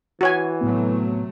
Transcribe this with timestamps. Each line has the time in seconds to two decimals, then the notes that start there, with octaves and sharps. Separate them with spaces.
0.21 E3 F#4 C#5 G#5
0.61 A2 C3 F#3 A3 B3